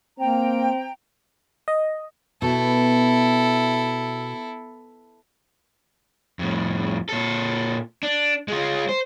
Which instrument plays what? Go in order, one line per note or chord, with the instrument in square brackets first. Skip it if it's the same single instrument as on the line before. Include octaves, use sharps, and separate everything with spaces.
[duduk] A#3 [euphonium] C4 [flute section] G5 A#5
[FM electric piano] D#5
[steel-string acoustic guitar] B2 [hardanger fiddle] E4 A4
[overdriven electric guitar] F2 A2
A#2 A4
D4
G#3 F4
C5